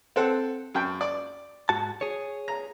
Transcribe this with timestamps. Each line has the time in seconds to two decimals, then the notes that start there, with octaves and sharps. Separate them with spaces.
0.16 C4 A4 F#5
0.75 F#2 G5
1.01 D5
1.69 G#2 F#4 A5
2.01 G#4 C#5
2.48 A#5